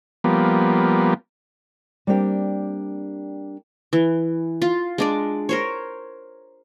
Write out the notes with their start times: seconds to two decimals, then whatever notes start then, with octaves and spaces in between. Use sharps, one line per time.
0.24 F3 G3 A#3 B3
2.07 G3 A#3 C4 D4 G4 G5
3.93 E3
4.62 F4
4.98 G#3 D4 D5
5.49 A#4 C5 C#5